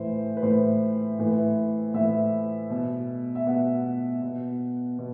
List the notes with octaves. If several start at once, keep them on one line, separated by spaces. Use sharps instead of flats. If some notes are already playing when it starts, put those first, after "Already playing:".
Already playing: A2 E3 C5
B4
A2 E3 C5
A2 E3
A2 E3 E5
B2
E5
B2 F#5
B2
B2